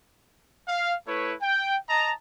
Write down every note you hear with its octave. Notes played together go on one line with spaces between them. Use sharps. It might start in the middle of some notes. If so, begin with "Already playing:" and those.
F5
A3 E4 B4 C#5
G5
D#5 A5 A#5